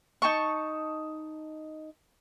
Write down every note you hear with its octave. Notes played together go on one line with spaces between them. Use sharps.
D#4 A5 C#6